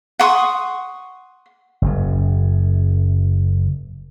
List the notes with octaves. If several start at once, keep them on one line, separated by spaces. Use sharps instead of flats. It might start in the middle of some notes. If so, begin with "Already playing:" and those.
F#5 C6 C#6 D#6
F#1 F#2